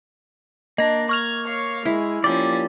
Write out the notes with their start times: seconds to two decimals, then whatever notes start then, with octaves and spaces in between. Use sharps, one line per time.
0.78 A#3 D4 D#5 A#5
1.09 C#6 F6 G#6 F7
1.47 C#5 F5
1.85 G#3 E4
2.24 F3 A#3 C#4 G4 D5